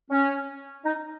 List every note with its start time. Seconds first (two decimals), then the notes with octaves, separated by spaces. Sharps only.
0.10 C#4
0.84 D#4